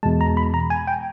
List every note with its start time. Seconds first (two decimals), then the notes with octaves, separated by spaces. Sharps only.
0.03 E2 B2 G#3 A5
0.21 A#5
0.37 B5
0.54 A#5
0.70 G#5
0.88 G5